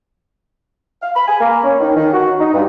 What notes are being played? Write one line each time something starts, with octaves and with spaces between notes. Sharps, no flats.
F5
B5
G#5
A#3
C#4
D#3
D#3
F#4
D#4
G2